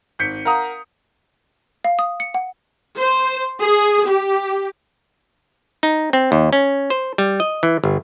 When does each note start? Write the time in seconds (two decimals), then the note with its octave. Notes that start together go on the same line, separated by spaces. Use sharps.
0.19 G#1 G6 B6 C#7
0.45 A#4 F5 F#5 A#5 D#6
1.85 F5
1.99 D#6
2.20 C#7
2.34 F#5
3.00 C5
3.59 G#4
4.06 G4
5.83 D#4
6.13 C4
6.32 D#2
6.53 C#4
6.90 C5
7.18 G3
7.40 D#5
7.63 E3
7.84 G1